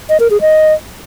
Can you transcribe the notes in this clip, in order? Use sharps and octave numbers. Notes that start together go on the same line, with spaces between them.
D#5
A#4
G#4
D#5